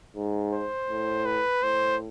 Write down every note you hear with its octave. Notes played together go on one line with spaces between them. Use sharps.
G#2
C5
A2
B4
A2 C5